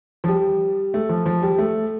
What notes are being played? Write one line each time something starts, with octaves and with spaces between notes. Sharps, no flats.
F3
G3
A3
F3
F3
G3
A3